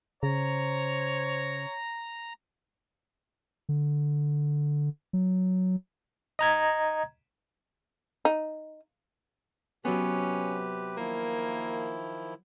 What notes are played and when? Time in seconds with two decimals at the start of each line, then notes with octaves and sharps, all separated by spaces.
0.23 C#3 C5 C#5 A#5
3.69 D3
5.13 F#3
6.39 D#5 A#5 G#6
8.25 D#4
9.85 C3 F#3 B3 C#4 G4 B4
10.97 D#3 F3 A#3 E4